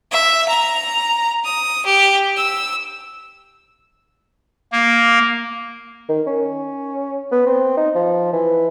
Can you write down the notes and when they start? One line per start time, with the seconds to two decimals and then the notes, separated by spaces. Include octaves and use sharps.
0.12 E5
0.49 A#5
1.45 D#6
1.86 G4
2.37 E6
4.72 A#3
6.09 D#3
6.27 C#4
7.32 B3
7.47 C4
7.77 D#4
7.95 F3
8.33 E3